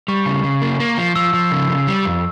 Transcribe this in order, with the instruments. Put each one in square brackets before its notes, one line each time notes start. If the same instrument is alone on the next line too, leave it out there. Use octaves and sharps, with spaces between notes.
[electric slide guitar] G3 [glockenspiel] C#6
[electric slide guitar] C#3
C#3
A#3
A#3
F3
[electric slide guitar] F3 [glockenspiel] E6
[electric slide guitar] F3
C#3
C#3
G3
F2